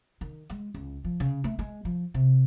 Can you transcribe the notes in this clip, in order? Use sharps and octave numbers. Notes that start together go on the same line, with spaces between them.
D#3
G#3
C#2
F3
C#3
A3
G#3
F3
C3